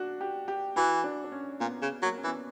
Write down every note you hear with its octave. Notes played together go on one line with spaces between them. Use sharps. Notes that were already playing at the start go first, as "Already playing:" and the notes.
Already playing: D4 F#4
G4
G4
E3 F#4
D4
D4
C#4
A#2 B3
C#3
F#3 A#3
C#4
E3
B3